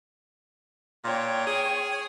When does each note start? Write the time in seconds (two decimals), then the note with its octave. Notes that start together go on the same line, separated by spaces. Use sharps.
1.05 A#2 C#5 G5
1.47 G#4